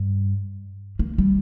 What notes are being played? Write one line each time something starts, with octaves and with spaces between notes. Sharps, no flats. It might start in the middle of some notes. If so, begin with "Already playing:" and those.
Already playing: G2
A#3
G3